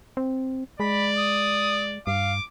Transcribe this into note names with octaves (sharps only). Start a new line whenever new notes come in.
C4
G#3 D5 B5
D#6
G2 F5 D6